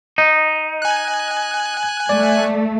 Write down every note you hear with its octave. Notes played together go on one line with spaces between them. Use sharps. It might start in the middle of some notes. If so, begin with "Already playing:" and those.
D#4 D#5
G#5 F#6
A3 D5